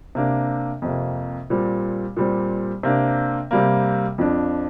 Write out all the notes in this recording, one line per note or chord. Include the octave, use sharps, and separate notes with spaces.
C3 A#3 D4
F2 C3 A#3
A#2 G3 C4
A#2 G3 C4
C3 A#3 D4
C3 G3 A#3
F2 F3 D4